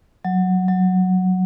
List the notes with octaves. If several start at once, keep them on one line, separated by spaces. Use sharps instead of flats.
F#3
F#3